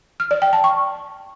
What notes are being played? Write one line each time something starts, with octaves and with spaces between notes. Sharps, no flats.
F6
D5
G5
A5
C#6